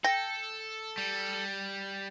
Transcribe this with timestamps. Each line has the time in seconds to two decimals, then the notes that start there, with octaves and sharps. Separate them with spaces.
0.04 A4 G5 A#6
0.98 G3